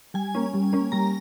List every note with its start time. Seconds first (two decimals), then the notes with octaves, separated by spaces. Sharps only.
0.14 G3 G#5
0.35 A#3 C#4
0.54 G3
0.73 A#3 C#4
0.92 G3 A#5